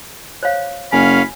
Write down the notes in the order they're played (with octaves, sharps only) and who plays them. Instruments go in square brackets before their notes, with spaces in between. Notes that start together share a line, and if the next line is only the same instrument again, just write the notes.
[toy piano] C5 C#5 F5
[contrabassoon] F#1 [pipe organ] C#4 F5 [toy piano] G#5 [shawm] B5